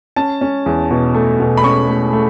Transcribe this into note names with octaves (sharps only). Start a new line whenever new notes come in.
C#4 A5
C#4
E2
B2
A3
B2
B5
C#4 C#6
A3
A3